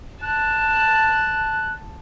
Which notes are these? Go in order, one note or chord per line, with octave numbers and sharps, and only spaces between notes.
A5 F#6